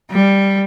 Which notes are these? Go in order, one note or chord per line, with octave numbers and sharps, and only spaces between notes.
G3